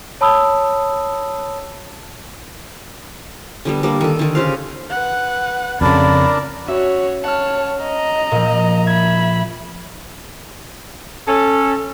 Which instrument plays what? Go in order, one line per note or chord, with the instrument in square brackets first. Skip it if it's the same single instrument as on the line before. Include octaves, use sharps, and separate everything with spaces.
[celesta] C#5 A5 B5 D#6 E6
[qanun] D3 G3 B3
G3 A#3 D4
D#3 A4
D3 D#3
C#3 G4 C5 F5
[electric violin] B4 F#5
[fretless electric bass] F2 C#3 [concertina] D4 A#4 [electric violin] D5 A5 [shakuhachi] B5
[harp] C#4 E5 [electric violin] F#4 C#5
[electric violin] C#5 A5 [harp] F#5 F6
[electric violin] D#5 A#5
[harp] A#2 F3
[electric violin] E5 B5 [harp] G#6
[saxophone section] C#4 A4